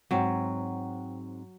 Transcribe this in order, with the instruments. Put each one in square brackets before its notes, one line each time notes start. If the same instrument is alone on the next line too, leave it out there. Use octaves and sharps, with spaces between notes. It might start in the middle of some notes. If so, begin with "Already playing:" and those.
[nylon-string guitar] G#2 C4 [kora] F#3 [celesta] C#5 F#5 G5